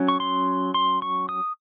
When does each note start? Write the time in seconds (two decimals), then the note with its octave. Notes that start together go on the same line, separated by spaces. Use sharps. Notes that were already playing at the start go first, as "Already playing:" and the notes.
Already playing: F#3 C#4
0.08 C#6
0.20 C6
0.74 C6
1.02 C#6
1.29 D#6